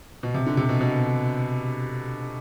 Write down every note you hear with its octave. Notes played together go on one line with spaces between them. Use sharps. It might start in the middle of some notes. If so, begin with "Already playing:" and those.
B2
C3
D3
C3
B2
B2